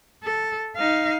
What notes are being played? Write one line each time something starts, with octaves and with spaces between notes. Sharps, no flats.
A4
D#4 F5